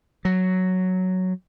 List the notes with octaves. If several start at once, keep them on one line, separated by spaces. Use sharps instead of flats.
F#3